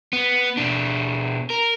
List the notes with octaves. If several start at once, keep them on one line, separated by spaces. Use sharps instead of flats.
B3
B2 D4
A#4